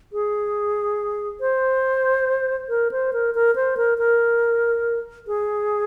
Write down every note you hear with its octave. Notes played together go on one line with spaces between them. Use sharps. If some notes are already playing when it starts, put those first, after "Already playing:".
G#4
C5
A#4
C5
A#4
A#4
C5
A#4
A#4
G#4